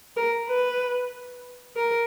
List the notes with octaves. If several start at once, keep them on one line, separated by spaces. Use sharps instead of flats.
A#4
B4
A#4